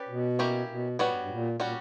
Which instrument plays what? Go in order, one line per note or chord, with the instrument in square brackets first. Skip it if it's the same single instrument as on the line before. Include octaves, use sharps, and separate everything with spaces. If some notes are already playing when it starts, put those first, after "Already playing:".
Already playing: [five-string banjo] C#4 G4 B4 D5
[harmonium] B2
[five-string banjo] A#3 C#4 E4 G4 C#5
[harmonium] B2
[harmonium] A#2 [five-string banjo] G3 B3 F#4 C#5
[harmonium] G2
G2
A#2
[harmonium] A#2 [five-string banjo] G3 C#4 F#4